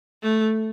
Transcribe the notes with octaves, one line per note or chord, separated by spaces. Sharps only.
A3